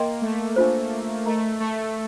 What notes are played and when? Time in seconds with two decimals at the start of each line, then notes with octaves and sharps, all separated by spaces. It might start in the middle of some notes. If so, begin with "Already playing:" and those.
Already playing: A#3 A#4 D#5 G5 C6
0.22 A3
0.56 D4 F4 C5
1.26 A3 A#4 D#5 A#5
1.60 A3